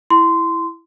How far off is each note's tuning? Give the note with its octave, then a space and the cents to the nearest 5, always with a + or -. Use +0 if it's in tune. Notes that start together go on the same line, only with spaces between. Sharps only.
E4 +5 C6 -15